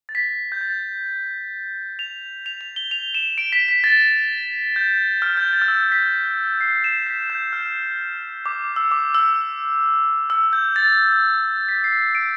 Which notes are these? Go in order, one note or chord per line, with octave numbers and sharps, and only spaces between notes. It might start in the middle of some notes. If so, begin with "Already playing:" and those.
A6
B6
G6
A6
F7
F7
F7
G7
F7
E7
D7
B6
B6
A6
G6
F6
G6
A6
F6
E6
B6
C7
E7
B6
G6
F6
D6
E6
D6
E6
E6
G6
A6
B6
C7
D7